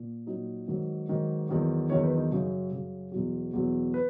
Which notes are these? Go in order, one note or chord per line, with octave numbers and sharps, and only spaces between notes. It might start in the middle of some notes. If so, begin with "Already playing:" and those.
Already playing: A#2
A#2 F#3 D#4
G#2 D#3 F#3
G#2 D#3 F#3
E2 D#3 F#3
E2 D#3 F#3 C#5
B4
D#4
F#2 C#3 F#3
F#2 C#3 F#3
E2 B2 F#3
E2 B2 F#3
B4